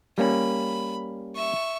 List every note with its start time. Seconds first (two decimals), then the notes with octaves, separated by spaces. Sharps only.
0.18 G3 A#3 C#4 B5
1.35 E5 C#6